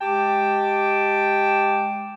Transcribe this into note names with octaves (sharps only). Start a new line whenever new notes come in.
G#3 G4 G5 A5 D6